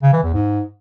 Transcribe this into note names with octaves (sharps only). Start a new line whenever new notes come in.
C#3
E3
E2
G#2